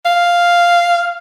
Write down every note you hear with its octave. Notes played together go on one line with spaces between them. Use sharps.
F5